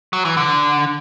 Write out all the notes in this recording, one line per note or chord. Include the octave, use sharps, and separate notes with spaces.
F#3
E3
D3